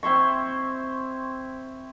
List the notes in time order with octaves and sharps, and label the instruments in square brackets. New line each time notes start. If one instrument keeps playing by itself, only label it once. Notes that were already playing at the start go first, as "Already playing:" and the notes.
[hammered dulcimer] C4 E4 C6 C#6